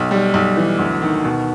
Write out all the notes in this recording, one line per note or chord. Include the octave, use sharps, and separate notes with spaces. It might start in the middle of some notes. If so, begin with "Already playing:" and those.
Already playing: B1
G3
B1
E3
D2
D#3
B2